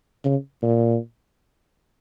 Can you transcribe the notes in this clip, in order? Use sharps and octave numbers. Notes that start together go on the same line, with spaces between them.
C#3
A#2